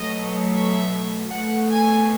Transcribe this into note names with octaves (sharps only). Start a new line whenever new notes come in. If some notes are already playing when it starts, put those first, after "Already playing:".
Already playing: B2 F#3 A3 D#5
E5
B2 A3 F#5
G#5